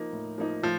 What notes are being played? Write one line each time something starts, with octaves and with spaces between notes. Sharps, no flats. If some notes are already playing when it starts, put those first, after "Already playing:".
Already playing: F3 A#3 D#4
A2
F3 A#3 D#4
A2 F3